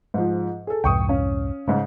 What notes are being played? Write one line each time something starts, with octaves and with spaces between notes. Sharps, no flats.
G#2 F3
G#4 A4
C2 F2 G#2 G5 C#6 D#6
C#4 F5
G#2 C#3 C#4